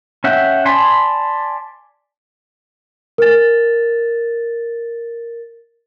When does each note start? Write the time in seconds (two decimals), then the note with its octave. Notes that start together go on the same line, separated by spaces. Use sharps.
0.24 C#4 E5 F#5 G5
0.65 D5 G#5 A5 B5 C6
3.18 A#4 A6